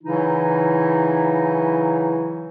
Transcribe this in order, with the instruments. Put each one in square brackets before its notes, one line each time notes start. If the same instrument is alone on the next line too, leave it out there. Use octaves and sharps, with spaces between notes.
[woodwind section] C#3 E3 F#3 D#4 E4